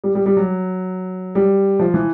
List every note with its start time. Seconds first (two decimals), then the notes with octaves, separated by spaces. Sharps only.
0.04 G3
0.15 G3
0.26 G3
0.37 F#3
1.35 G3
1.79 F3
1.94 E3